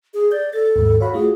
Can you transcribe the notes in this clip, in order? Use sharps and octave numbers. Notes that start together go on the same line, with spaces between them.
G#4
D5 G6
A4 A6
D#2 G#2
F#4 C#5 F5 B5
A3 F4 F#4 G#4